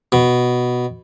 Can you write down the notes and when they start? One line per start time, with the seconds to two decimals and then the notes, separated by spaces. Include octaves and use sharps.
0.12 B2